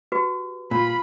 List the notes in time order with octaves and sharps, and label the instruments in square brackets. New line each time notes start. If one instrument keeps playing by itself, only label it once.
[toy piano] F#4 G4 B4
[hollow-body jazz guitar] A#2 [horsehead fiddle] F4 B5